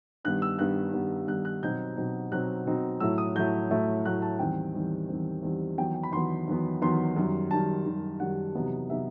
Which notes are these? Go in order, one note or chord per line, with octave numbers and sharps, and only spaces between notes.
G2 D#3 G3 B3 F#6
E6
G2 D#3 G3 B3 F#6
G2 D#3 G3 B3
G2 D#3 G3 B3 F#6
F#6
B2 F#3 C4 D#4 G6
B2 F#3 C4 D#4
B2 F#3 C4 D#4 F#6
B2 F#3 C4 D#4
A2 F#3 A3 E4 E6
D#6
A2 F#3 A3 E4 G6
A2 F#3 A3 E4
A2 F#3 A3 E4 F#6
A5
E2 D#3 G3 C4 G5
E2 D#3 G3 C4
E2 D#3 G3 C4
E2 D#3 G3 C4
E2 D#3 F#3 B3 G5
G5
B5
E2 D#3 F#3 B3 C6
E2 D#3 F#3 B3
E2 D#3 F#3 B3 C6
F#2 D#3 G3
F#2 D#3 G3 A5
F#2 D#3 G3
F#2 D#3 G3 F#5
E2 C3 F#3 B3 D#4
C3 F#3 B3 D#4 E5